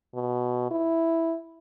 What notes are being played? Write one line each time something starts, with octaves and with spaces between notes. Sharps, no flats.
B2
E4